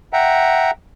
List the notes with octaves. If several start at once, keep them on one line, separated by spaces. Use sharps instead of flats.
E5 F#5 G5 A#5